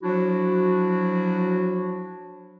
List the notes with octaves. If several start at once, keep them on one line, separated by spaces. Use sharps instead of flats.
F3 F#3 D4 E4 F#4